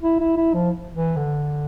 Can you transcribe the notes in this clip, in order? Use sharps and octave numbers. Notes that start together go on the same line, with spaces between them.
E4
E4
E4
F3
E3
D3